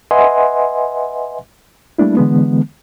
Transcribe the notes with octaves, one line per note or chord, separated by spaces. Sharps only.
B4 D#5 E5 F#5 G#5 C6
G3 A3 A#3 D4 E4
D3 E3 G#3 B3